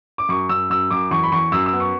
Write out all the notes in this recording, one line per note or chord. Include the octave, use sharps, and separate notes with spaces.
D6
F#2 C#6
F#2 E6
F#2 E6
F#2 D6
E2 C#6
B5
E2 C#6
F#2 E6
E6
B3
C#6